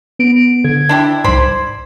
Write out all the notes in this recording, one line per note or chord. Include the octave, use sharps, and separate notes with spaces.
B3 D7
D3 G#6
D4 E4 G4
C2 G#2 C5 D5 B5